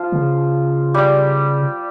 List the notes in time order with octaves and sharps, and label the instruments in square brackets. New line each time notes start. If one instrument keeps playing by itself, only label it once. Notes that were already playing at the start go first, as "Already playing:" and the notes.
Already playing: [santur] F3 F4
[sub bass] C#3
[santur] G3 G4